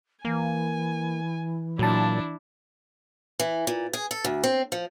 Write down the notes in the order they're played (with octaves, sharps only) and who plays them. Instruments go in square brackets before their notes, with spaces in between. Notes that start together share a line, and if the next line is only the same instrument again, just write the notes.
[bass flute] E3 [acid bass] A#3 [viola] G#5
[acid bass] A#2 [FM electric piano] F#3 A5 [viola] D4 E4
[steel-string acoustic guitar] E3
A#2
G#4
A4
D2
C4
F3